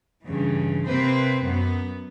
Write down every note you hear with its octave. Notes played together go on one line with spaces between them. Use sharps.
G2 C#3 E3
C3 A#3 C4 B4 C5
F#2 B3